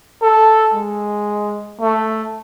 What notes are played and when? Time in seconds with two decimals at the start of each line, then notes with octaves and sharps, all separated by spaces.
0.22 A4
0.74 G#3
1.81 A3